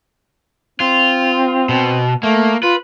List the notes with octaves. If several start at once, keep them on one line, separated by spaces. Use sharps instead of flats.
C4 F4
B2
A3 A#3
F4 B4